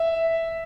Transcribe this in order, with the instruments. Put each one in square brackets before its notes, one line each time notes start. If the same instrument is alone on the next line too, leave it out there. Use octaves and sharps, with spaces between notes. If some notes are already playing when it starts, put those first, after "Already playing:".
Already playing: [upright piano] E5